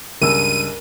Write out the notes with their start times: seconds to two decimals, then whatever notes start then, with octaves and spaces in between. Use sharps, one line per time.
0.22 C#2 G2 A#4 E6 D#7